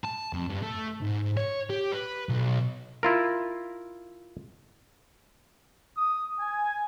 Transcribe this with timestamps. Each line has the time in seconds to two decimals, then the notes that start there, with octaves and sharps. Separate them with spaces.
0.04 A5
0.33 F2
0.50 G2
0.63 A3
1.02 G#2
1.37 C#5
1.70 G4
1.92 B4
2.29 B1
3.03 E4 F4 A#4
5.98 D#6
6.40 G#5